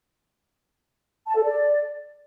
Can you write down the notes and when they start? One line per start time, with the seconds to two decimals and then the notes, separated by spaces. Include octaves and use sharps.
1.27 A5
1.36 A4
1.44 D5